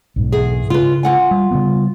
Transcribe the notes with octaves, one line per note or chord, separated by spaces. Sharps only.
B1 G#2 G#3
E2 G#4
C#3 F4 B4
F4 F#5 G#5
G3
C#3 G3 B3